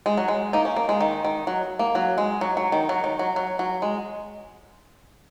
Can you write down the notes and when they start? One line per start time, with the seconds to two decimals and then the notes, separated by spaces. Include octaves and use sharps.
0.06 G#3
0.17 F#3
0.28 G#3
0.53 A#3 D#4
0.65 C#4
0.76 A#3
0.89 G#3
1.01 D#3
1.25 D#3
1.47 F#3
1.79 A#3
1.95 F#3
2.18 G#3
2.41 F#3
2.57 F#3
2.72 D#3
2.89 F#3
3.04 D#3
3.19 F#3
3.36 F#3
3.59 F#3
3.82 G#3